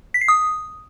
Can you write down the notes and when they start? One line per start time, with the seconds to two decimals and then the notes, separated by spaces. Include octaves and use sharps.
0.14 B6
0.21 C7
0.28 D#6